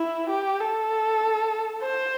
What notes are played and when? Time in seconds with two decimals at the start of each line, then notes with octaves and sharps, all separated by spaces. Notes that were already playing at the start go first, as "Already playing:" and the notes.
Already playing: E4
0.30 G4
0.60 A4
1.82 C5